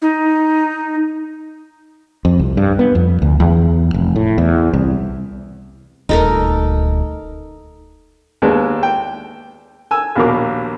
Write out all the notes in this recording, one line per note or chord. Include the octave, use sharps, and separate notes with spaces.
D#4
F2
C2
G2
B3
F2
D2
E2
F1
A2
E2
C2
D#1 D2 D#4 A4 A#4
D#2 G#3 B3 D4
G5
G#5 E6
A#1 D#2 B2 A#4 D6